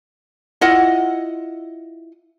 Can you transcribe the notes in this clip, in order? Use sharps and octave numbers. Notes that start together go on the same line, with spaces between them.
E4 F4 D#5 F#5